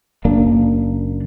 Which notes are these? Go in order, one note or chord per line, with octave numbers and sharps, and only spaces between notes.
F#1 A#3 D4